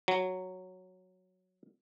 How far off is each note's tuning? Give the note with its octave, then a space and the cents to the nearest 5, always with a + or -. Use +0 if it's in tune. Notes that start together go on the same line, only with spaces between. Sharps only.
F#3 -5